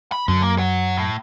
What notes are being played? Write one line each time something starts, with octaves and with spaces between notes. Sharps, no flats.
B5
F#2 D3
A#3
C#5 F#5
A2